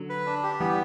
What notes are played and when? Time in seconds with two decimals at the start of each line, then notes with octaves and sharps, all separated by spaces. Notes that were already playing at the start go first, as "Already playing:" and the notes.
Already playing: D3 F#3
0.09 B4
0.26 D4
0.43 G4
0.60 E3 G3 B3